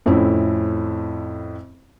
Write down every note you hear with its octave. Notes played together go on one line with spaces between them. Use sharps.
F2 A2 C4 C#4 E4